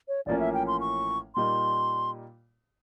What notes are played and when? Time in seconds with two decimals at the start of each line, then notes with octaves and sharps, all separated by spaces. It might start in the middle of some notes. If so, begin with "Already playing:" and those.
0.08 C#5
0.26 A1 A2 F3 A#3 C#4 D5
0.40 E5
0.54 G5
0.67 C6
0.81 C#6
1.35 A#2 G3 A#3 D#4 C6